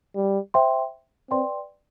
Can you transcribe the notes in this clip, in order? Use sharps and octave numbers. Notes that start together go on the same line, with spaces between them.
G3
C5 E5 G5 C6
C4 B4 D5 G5 C6